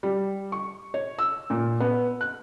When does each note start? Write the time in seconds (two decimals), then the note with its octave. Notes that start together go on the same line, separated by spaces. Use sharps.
0.03 G3
0.52 C#6
0.94 C#5
1.19 E6
1.50 A#2
1.80 B3
2.21 F#6